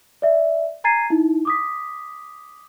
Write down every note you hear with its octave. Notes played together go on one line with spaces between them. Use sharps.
D5 E5
G#5 A#5 G#6 A6 C7 D#7
D#4 E4
D6 D#6 B6